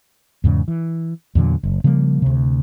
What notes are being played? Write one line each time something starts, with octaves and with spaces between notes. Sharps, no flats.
E2 G#2 C#3
E3
E2 A#2 D3 F#3
F#1
C#3 F3 G3 A#3
D2 C3